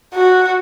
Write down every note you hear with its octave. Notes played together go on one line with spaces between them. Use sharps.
F#4